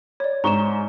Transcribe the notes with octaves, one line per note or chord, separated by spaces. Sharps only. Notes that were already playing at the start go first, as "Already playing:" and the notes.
C#5 D5
G#2 A#5 C#6 E7 G7